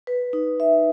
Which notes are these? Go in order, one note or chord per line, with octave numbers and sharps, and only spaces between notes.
B4
D#4
E5